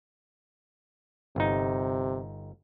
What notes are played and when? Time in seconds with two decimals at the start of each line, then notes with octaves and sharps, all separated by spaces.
1.36 G1 C3 D#4